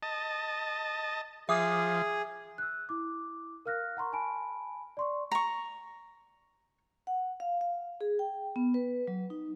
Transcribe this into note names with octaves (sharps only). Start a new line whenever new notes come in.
D#5 A5
F3 G#4 E5 D6 D#6
E6 F#6
E4 D6
A#4 F5 F6 F#6 A#6
F#5 A#5 C6 C#6
G#5 A5 B5 D7
D5 C6 C#6
A#5 C#6
F#5
F5
F5
G#4
G5
B3
B4
F#3
D#4